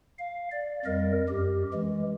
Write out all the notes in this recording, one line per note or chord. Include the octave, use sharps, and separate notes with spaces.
F5
D5
F2 G3 A#4 D#5
F#2 G4
E3 G#3